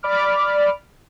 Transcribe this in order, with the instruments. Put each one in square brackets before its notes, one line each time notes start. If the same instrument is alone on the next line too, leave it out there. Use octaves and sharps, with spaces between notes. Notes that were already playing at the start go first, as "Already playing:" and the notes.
[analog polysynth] D5 B5 D6 F6